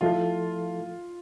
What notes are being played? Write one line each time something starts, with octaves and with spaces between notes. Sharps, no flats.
F3 A3 E4 F4 A4